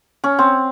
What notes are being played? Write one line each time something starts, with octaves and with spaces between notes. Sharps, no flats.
C#4
C4